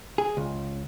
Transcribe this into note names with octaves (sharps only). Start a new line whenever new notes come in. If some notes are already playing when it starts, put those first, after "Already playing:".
G#4
C#2